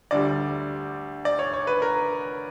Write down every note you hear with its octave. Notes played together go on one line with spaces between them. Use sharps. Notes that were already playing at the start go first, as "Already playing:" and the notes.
D2 D3 G3 D5
D5
C#5
C#5
B4
A#4